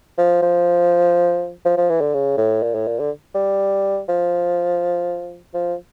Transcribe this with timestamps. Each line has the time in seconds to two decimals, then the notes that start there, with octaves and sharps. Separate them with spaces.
0.18 F3
0.42 F3
1.65 F3
1.78 F3
1.90 E3
2.01 D3
2.14 C#3
2.37 A2
2.63 A#2
2.75 A2
2.87 A#2
2.99 D3
3.35 G3
4.09 F3
5.54 F3